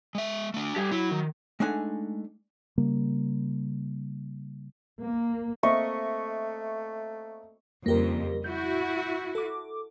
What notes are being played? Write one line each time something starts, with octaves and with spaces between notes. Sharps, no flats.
G#3 E5
A3 D4
G3 G4 G#5
F#3 E4
D#3
G#3 A3 D4 D#4 F#5 G#5
C#3 G3 A#3
A#3
A3 A#3 C4 D#5 E5 C#6
F2 C#3 G3 A#3 G4 A#4
E4 F#4 G6
A4 D6